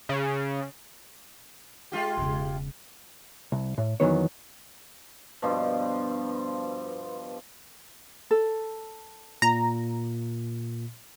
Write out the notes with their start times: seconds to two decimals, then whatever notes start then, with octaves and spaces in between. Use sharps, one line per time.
0.09 C#3
1.92 G#3 F4 G4
2.18 E1 C#3
3.52 C2
3.78 A2
4.00 F2 D#3 E3 F#3 B3 C#5
5.42 G2 B2 F3
8.31 A4
9.42 A#2 A#5